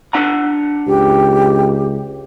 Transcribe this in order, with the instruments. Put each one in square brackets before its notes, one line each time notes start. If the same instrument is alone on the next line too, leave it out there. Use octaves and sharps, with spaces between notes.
[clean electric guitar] D4 F#5 A#5
[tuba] C#2 [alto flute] G4